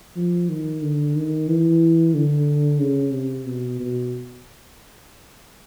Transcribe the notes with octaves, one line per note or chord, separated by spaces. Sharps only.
F3
D#3
D3
D#3
E3
D3
C#3
C3
B2
B2